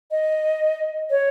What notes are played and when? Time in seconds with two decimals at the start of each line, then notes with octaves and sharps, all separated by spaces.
0.11 D#5
1.10 C#5